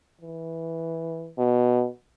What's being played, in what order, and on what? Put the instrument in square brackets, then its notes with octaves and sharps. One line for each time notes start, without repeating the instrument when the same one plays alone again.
[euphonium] E3
B2